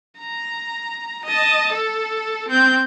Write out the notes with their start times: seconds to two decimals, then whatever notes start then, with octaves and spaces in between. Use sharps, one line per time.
0.19 A#5
1.25 D#5 A5
1.72 A4
2.49 C4 G6